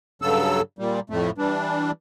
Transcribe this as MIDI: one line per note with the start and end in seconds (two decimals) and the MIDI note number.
0.22 0.61 43
0.22 0.61 49
0.22 0.61 54
0.22 0.61 69
0.22 0.61 88
0.79 1.00 46
0.79 1.00 55
1.10 1.30 41
1.10 1.30 45
1.10 1.30 57
1.38 1.91 52
1.38 1.91 55
1.38 1.91 62